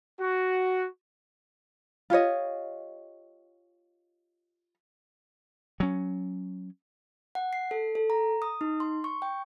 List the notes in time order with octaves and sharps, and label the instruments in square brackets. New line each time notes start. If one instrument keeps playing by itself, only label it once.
[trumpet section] F#4
[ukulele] F4 G4 C#5 D#5
[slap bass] F#3 C#4
[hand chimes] F#5
C7
A4
A4
A#5
D#6
D#4
C6
C#6
G5